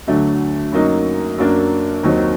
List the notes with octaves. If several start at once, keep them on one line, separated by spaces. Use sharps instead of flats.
D2 D3 F#3 A3
F#2 F#3 A#3 D#4
F#2 F#3 A#3 D4
D#2 D#3 F#3 C4 D#4